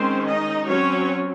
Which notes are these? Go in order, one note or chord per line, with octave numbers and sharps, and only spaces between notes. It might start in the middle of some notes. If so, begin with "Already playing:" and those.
Already playing: D#3 G#3 C4 C#4 C5
D#4 D#5
F#3 C4 C#4 C#5